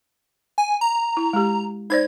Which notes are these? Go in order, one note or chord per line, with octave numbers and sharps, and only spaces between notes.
G#5
A#5
E4
G#3 G4
D#4 C5 D5 G#6